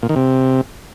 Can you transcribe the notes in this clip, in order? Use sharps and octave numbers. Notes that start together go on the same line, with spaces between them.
A#2
D#3
C3